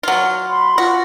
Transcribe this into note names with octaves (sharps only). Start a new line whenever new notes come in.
F#3 F4
B5 C6
F4 F#4